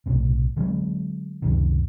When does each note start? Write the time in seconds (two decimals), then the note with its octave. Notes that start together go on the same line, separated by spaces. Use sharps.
0.06 B1 A2 C3
0.56 D3 F#3 G#3 C4
1.42 C#2 F#2 C3 D#3